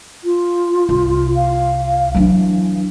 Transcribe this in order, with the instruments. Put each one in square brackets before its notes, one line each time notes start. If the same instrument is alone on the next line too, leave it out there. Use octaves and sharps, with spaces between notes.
[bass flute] F4
[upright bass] C2
[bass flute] F5
[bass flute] E3 [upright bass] F#3 D4